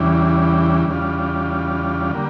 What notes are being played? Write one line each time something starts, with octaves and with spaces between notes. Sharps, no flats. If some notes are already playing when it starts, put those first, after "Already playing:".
Already playing: E2 C#3 E3 G3 D4
E2 C#3 G3 D4 F4
D3 G3 A#3